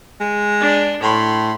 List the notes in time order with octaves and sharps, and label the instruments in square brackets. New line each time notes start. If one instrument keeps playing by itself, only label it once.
[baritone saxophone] G#3
[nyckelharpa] D4 D5
[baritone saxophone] A2 [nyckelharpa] B5 C6